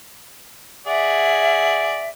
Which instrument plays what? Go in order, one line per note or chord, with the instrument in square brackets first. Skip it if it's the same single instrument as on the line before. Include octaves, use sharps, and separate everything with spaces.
[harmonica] G#4 D5 F#5 [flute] E5